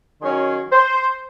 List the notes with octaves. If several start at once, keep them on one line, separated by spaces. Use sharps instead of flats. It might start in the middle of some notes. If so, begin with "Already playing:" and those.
D#3 F#3 C#4 G#4
C5